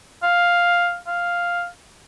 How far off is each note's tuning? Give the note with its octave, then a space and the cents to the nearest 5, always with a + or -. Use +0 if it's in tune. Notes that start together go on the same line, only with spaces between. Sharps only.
F5 +5
F5 +0